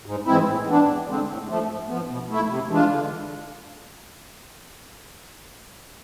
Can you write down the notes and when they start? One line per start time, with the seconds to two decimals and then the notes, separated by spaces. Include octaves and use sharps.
0.06 G#2
0.26 E3 G#3 C4 E4
0.47 A2
0.67 E3 B3 D4
0.88 E2
1.08 D3 G#3 C4
1.28 A2
1.49 F3 A3
1.69 G#2
1.88 F3 B3
2.09 B2
2.29 A3 E4
2.49 C3
2.70 E3 G#3 D4 F4
2.89 D3